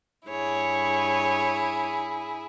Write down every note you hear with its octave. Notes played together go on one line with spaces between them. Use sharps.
G2 E4 G#4 C#5